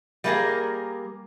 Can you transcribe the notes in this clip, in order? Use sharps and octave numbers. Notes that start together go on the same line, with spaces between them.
G3 A3 A#3 E4 G#4 A#4